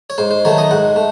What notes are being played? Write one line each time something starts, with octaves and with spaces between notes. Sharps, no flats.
C#5
G#2 C5
C5
D#3 F#3 A3 C#5
D#5
G#2 F#5
A3